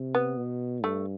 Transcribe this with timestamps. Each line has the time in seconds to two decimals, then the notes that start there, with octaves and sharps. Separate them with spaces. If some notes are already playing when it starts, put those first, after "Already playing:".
Already playing: C3
0.15 B3
0.37 B2
0.83 G2 A3